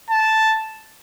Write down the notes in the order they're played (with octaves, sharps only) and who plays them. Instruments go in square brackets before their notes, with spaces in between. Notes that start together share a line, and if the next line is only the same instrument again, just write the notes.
[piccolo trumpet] A5